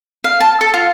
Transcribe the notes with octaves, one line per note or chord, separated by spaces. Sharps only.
F5
A5
A4
F4